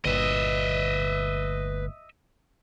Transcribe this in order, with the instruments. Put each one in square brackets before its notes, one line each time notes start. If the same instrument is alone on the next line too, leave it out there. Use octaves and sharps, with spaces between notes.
[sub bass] G1 [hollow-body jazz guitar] D2 G2 A#2 [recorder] B4 [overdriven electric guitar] D#5 E5